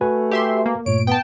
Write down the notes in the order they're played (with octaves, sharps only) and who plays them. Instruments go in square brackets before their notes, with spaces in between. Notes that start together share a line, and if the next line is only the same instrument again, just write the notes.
[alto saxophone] A3 [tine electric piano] F#4 B4 G#5
[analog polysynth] G4 E5 C6
A#3
[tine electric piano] G2 A#2 A3 [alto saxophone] C#5 [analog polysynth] D7
[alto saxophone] B3 [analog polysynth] G5 A5